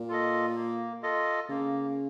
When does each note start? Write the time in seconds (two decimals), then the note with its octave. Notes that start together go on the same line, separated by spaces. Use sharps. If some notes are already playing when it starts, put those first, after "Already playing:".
Already playing: A#2
0.09 F4 A4 D#5
0.55 A#3
1.02 F4 A4 D#5
1.49 C#3 A#3